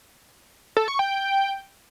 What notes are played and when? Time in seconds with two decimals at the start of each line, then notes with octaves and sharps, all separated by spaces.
0.77 A4
0.88 C#6
0.99 G5